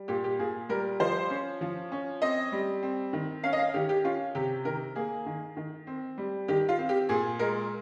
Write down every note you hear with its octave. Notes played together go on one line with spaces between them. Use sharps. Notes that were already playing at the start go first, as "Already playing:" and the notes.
Already playing: G3
A#2 G4
G4
A#2 G#4
G3 A#4
F3 C5
C#4
F3
C#4
C4 D#5
G3
C4
D#3
C#4 F5
D#5
F5
D#3 G4
G4
C#4 F4
C3 G4
D#3 A#4
A#3 G#4
D#3
D#3
C4
G3
D#3 G4
F4
C4
G4
A#2 G#4
G#3 A#4